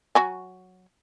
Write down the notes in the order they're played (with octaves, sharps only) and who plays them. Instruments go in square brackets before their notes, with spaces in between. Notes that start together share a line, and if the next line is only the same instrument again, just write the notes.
[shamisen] F#3 F#4 G#5